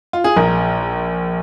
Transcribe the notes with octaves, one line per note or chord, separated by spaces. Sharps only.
F4
G#4
A#1 A#4